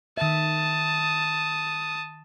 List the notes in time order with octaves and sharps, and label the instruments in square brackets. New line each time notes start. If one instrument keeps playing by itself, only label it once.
[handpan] D#3 E5 [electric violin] A5 D#6